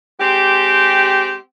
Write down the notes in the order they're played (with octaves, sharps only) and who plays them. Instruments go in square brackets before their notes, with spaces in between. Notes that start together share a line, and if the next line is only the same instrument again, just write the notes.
[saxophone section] G#3 C4 G4